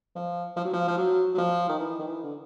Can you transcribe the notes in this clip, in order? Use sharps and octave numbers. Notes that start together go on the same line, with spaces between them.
F3
F3
F#3
F3
F3
F#3
F#3
F3
D#3
E3
D#3
E3
D3